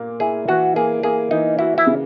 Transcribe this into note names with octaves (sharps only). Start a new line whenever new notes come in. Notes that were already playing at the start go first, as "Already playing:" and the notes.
Already playing: A#2 A#3
E4 G#4
E3 F#4
A#3 G#4
A#3 G#4
E3 D#4
E4 F#4
E4
C#3